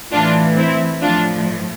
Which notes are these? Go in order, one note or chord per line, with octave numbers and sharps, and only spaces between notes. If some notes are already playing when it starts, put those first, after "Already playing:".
A2 E3 D4 F4
C4 E4
A2 F3 D4 F4